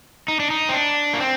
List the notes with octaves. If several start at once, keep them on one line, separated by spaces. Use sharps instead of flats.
D#4
D4
D#4
C4
D4
A#3
C4